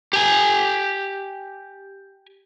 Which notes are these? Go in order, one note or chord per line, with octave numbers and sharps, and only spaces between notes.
G4 G#5